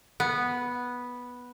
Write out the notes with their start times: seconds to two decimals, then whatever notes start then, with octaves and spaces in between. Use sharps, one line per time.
0.20 B3